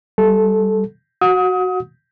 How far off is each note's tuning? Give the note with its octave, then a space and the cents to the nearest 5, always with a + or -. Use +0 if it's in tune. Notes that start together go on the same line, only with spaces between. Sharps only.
G3 -15 A4 -10
F#4 +0 F#5 -30 D#6 +30